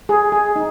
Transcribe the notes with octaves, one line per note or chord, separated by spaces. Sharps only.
G#4
G#4
D#4